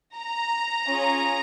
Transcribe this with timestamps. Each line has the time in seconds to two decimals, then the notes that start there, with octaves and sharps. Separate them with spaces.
0.16 A#5
0.86 C#4 F4 G#4